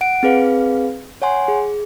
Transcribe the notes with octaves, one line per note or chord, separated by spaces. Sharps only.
F#5 D7
C4 G#4 B4 F5
C#5 F#5 G#5 C6
G#4